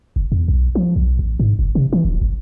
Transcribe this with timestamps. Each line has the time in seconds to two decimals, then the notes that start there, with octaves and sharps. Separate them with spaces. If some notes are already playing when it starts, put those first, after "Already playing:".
0.16 F#1
0.32 E2
0.48 B1
0.75 F3
0.96 B1
1.19 A1
1.40 G#2
1.59 F#1
1.75 C3
1.93 E3
2.05 D#1
2.21 G1